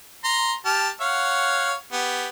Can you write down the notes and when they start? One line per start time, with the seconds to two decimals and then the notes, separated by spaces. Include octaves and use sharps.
0.24 A#5 C6
0.65 G4 A5 F6
1.01 C#5 F5 F#5
1.93 B3 G4